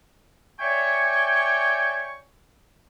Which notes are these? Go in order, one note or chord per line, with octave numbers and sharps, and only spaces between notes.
C#5 D5 E5 G5 G#5 C#6